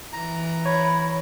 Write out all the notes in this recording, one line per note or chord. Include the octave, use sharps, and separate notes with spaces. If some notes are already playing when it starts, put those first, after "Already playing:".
E3 A#5
C#5 B5